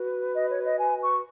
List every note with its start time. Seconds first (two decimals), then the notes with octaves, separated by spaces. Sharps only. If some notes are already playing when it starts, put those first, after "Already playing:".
Already playing: F#4 B4
0.35 D#5
0.50 C#5
0.66 D#5
0.79 G#5
1.02 C#6